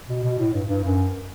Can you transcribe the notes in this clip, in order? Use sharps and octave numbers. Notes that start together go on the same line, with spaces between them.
B2
B2
A2
G2
G2
F#2